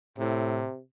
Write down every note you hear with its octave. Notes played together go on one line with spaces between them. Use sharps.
A2 C3